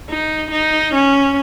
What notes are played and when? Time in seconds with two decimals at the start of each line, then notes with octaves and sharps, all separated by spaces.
0.10 D#4
0.52 D#4
0.95 C#4